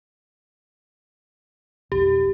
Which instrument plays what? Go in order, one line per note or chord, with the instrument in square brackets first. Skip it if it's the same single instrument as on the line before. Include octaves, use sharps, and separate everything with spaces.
[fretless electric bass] B1 F2 [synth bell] G4